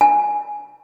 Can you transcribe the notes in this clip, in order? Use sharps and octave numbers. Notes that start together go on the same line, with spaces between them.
G#5